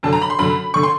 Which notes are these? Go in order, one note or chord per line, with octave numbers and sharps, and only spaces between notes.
F#2 D3 A5
A#5
B5
C6
F#2 D3 B5
D3 C#6
C6